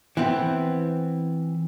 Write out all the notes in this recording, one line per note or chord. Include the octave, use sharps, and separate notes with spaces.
E3 B3 C4